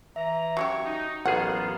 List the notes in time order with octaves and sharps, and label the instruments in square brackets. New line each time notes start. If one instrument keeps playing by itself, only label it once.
[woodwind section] E3 A#5 [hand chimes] E5
[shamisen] F#3 C#4 G4 [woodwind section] C#6
[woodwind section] D#4
[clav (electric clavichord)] A1 G#4 [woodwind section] F#3 B3 F4 [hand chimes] A#4 A#5 [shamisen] F#5